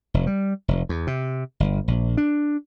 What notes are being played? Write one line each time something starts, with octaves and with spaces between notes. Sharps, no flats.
F1
G3
F1
E2
C3
G1
A#1
D4